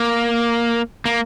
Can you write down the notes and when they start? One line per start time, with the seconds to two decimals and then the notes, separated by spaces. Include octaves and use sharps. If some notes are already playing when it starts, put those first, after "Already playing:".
Already playing: A#3
1.06 A#3